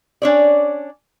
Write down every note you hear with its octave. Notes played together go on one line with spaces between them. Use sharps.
C#4 D4 C#5 D5